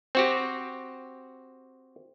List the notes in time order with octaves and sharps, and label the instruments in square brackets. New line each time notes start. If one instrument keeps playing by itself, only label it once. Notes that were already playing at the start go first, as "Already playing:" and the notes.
[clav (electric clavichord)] C4 F#4 G4